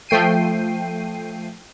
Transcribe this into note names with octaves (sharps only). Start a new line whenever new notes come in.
F3 A3 G5 C7 D#7